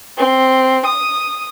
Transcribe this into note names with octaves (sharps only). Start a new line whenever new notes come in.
C4
D#6